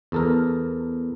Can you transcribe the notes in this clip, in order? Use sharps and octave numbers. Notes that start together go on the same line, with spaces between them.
E2 A4 A#4